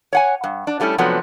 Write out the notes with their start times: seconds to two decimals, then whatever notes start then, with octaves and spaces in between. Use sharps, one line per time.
0.13 C#5 F#5 G#5
0.44 G2
0.67 D4
0.80 F#3 G3 A3 C#4 E4
0.98 C3 F3 F#3 A3 B3 D4